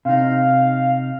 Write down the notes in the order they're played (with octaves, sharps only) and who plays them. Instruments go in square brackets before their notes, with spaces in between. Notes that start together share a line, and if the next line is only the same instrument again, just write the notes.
[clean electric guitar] C3 D#4 [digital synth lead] F5